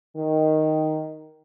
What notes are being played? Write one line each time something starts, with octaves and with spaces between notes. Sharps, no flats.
D#3